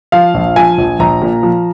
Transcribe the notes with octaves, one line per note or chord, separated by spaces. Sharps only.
F3 F5
A#1
F3 G#5
A#1
A#1 A#5
A#2
F3